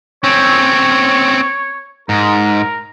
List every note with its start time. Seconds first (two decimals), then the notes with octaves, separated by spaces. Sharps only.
0.24 C4 C#4 C#5
2.09 G#2 A#4